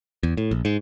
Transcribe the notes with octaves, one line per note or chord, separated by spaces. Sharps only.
E2
A2
A#1
G#2